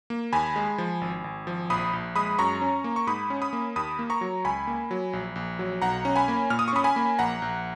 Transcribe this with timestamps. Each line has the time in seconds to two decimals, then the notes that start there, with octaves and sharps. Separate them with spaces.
0.10 A#3
0.33 D#2 G#5 B5
0.56 G#3
0.78 F3
1.01 G#1
1.24 G#1
1.47 F3
1.70 A#1 B5 D#6
1.93 A#1
2.16 G#3 B5 D#6
2.39 F#2 A#5 C#6
2.62 C#4
2.84 A#3
2.96 C#6
3.07 G#2 B5 D#6
3.30 C#4
3.42 B5 D#6
3.53 A#3
3.76 D#2 B5 D#6
3.99 A#3
4.10 A#5 C#6
4.21 F#3
4.44 C#2 G#5 B5
4.67 A#3
4.91 F#3
5.13 A#1
5.36 A#1
5.59 F#3
5.82 B1 F#5 A#5
6.05 C#4
6.16 G#5 B5
6.28 A#3
6.50 A#2 F6
6.59 D#6
6.68 C#6
6.73 C#4 B5 D#6
6.84 G#5 B5
6.96 A#3
7.19 A#1 F#5 A#5
7.42 A#1